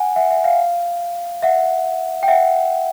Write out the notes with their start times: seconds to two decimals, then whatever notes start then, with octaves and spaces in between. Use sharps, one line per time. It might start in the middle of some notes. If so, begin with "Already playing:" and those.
Already playing: F#5 G#5
0.16 E5 F#5
0.30 E5
0.44 F5
1.43 E5 F#5
2.23 G5
2.28 E5 F#5